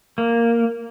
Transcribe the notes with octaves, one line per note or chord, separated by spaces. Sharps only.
A#3